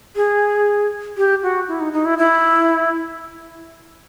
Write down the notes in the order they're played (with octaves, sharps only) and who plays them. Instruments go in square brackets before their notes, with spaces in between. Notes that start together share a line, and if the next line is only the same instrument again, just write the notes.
[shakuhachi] G#4
G4
F#4
E4
D#4
D#4
E4
E4